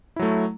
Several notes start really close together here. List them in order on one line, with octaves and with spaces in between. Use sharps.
E4 F#3 A3